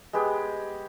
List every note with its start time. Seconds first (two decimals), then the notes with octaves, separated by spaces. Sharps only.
0.13 G#3 B3 G4 G#4